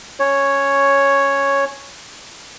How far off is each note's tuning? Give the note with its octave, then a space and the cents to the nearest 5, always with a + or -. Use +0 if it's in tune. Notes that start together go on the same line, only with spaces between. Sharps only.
C#4 +0 C#5 +0